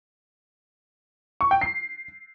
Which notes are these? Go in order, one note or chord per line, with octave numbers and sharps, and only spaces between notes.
C#6
G5
C7